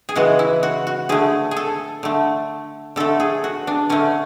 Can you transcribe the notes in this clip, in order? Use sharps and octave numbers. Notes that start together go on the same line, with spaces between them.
G#4
C#3 E3 G#3 F#4
E4
F#4
F#4
D3 A3 G#4
G#4
A4
D3 A3
D3 A3 A4
G#4
F#4
D4
D3 A3 C#4